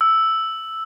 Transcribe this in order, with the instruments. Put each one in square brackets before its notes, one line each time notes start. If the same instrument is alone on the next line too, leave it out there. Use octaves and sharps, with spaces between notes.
[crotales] E6